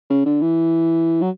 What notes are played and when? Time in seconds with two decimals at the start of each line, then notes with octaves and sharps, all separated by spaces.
0.10 C#3
0.26 D3
0.42 E3
1.22 F#3